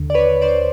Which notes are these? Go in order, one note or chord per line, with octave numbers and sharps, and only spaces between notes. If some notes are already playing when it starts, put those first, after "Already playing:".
Already playing: D#2 D3
D5
B4 C#5
C5 D5